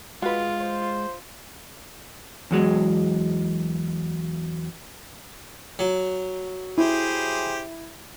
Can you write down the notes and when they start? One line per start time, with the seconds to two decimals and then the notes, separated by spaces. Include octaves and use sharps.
0.22 G#3 F4 F#4 B4
0.61 C5
2.51 E2 F#3 G#3
5.79 F#3
6.78 E4 G4 G#4 C5